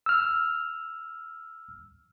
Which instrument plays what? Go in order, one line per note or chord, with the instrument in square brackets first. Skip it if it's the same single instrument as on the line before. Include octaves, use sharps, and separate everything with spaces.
[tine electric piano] E6 F6